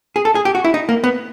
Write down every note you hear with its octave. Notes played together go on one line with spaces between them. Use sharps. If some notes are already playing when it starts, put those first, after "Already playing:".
G#4
A4
G#4
G4
F#4
E4
D#4
A#3
B3